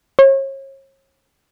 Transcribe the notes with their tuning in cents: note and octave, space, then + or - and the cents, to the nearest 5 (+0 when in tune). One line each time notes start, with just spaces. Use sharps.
C#5 -40